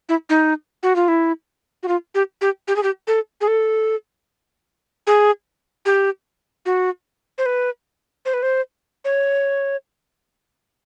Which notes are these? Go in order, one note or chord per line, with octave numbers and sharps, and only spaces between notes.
E4
D#4
F#4
F4
E4
F#4
F4
G4
G4
G4
G#4
G4
A4
G#4
A4
G#4
G4
F#4
C5
B4
C5
B4
C5
C#5